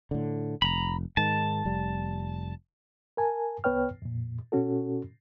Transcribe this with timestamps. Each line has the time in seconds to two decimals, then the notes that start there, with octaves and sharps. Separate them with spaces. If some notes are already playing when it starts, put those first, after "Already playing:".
0.11 A2 D3
0.62 F1 A#5 B5
1.17 G#2 D#3 A5
1.65 F1 G3
3.17 A#4 G#5 A5
3.64 C2 B3 B4 C#5 G5 F6
4.02 F2 A#2
4.52 B2 C#4 F#4 A4